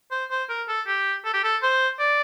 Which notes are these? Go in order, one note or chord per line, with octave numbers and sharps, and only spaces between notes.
C5
C5
A#4
A4
G4
A4
G4
A4
C5
D5